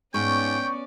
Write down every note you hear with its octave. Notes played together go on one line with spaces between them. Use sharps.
G#2 B3 C#4 D5 G5 C#6